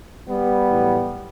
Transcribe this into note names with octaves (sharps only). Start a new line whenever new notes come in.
G3 B3
B1 A2 E3